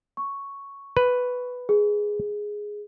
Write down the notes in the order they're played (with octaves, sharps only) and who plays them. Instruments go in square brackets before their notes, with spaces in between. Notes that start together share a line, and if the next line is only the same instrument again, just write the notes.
[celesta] C#6
[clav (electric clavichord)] B4
[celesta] G#4